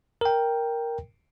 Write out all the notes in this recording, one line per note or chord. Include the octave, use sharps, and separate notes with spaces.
A#4 G5